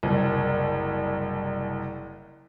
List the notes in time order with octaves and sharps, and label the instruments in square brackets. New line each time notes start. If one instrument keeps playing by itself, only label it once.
[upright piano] F#1 C2